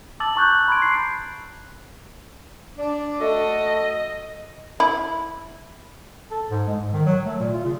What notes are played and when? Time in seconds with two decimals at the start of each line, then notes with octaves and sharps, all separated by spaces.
0.20 A5 D6 E6 A6 F#7
0.36 A#5 C#6 F#6 G6
0.68 B5 C6 G#6 D7
0.82 C7
2.78 D4 D5
3.19 A3 F#4 A4 D#5
4.80 E4
6.31 A4
6.50 G#2
6.68 G#3
6.80 G#2
6.93 D#3
7.06 F#3
7.25 A3
7.40 A#2
7.53 F4
7.65 C#3